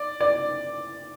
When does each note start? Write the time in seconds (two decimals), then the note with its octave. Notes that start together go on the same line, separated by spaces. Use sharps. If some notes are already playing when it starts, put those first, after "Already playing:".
Already playing: D5
0.21 D5